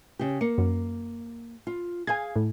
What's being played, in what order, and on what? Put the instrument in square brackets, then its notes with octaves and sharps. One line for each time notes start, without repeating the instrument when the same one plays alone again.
[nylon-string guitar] C#3 G4
[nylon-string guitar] A#3 [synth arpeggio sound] C#7
[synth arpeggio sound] F#2
[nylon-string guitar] F4
[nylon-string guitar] G#4 F5 [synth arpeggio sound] G#5 G#6
[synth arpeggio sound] A2